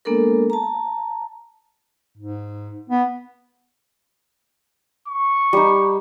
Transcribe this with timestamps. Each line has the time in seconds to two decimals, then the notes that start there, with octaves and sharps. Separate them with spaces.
0.05 G#3 A#3 B3 D4 A4 A#4
0.50 A5 A#5
2.17 G#2
2.89 B3
5.08 C#6
5.53 G3 D#4